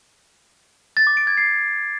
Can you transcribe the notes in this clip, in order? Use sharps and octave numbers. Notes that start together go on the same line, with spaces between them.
A6
D6
D7
G#6
C7